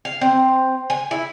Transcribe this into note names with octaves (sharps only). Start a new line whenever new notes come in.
F5
C4
G#5
E4